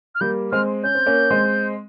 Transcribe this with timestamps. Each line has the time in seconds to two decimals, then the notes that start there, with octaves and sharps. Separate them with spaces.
0.15 F6
0.21 G3 A#3 G6
0.52 G#3 C4 F6
0.84 C#4 G6
0.95 C4
1.06 A#3 C#4
1.30 G#3 C4